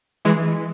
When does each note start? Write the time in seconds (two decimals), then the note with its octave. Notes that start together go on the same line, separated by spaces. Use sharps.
0.25 E3 G#3